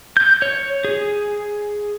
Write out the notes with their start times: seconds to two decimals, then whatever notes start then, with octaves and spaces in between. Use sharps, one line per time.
0.17 G6
0.42 C#5
0.85 G#4